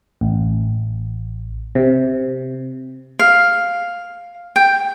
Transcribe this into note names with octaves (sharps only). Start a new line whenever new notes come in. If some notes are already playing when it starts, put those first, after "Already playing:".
A1
C3
F5
G5